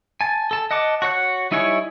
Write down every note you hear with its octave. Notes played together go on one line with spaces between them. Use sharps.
G#5 A5
A4 A5
D#5 F#5 A5 D6
F#4 C#5 F#5 F#6
G3 D#4 E4 C#5 G#5